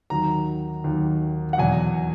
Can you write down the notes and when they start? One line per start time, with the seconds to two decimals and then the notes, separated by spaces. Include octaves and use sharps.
0.10 D#2 D#3 F#3 A#5
0.84 D#2 D#3 F#3
1.53 F#5
1.58 E2 B2 F#3 G#5